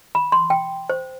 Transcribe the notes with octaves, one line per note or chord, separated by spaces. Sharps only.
B5
C6
G5
C5